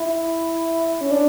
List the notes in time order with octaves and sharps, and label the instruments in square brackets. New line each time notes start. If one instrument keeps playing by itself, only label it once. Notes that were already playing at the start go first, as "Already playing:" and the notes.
Already playing: [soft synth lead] E4
C#4
D4